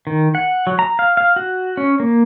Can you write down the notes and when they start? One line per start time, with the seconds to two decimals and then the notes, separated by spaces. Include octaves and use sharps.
0.07 D#3
0.35 F#5
0.67 F#3
0.79 A#5
0.99 F5
1.17 F5
1.36 F#4
1.77 C#4
2.00 A#3